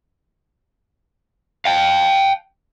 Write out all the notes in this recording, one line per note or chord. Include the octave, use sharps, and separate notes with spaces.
F5 G5